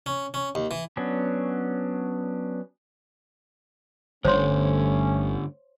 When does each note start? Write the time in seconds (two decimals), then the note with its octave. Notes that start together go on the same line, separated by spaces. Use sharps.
0.06 C#4
0.34 C#4
0.55 D#2
0.71 E3
0.97 F#3 B3 C#4 D4
4.25 G1 G2 D3 A3 C#4 C5 C#5 C6